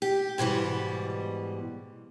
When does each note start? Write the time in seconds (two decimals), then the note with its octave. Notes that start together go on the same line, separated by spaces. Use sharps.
0.02 G4
0.38 G#2 B2 E3 G3